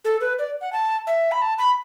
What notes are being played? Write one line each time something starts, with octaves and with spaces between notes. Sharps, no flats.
A4
B4
D5
F#5
A5
E5
B5
A5
B5